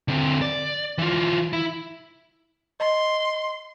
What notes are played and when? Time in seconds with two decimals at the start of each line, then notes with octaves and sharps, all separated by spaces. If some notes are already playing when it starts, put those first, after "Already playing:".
0.08 D3 C4
0.42 D5
0.99 E3 F4
1.53 E4
2.80 D#5 C6